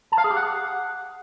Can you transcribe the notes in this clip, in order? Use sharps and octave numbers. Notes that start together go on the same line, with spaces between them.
A5
F5
G#4
G4
F#5